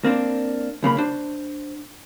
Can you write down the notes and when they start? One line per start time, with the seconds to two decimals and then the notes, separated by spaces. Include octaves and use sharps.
0.04 A#3 C4 D4
0.83 B1 C#3 A#3 B5
0.98 D4 C5